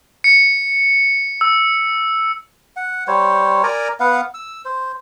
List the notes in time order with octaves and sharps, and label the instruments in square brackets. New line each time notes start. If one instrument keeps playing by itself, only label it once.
[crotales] C#7
E6
[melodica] F#5
G3 C5 C#5
A#4 D5 G#5 A#5
B3 B4 F5 F#5
E6
C5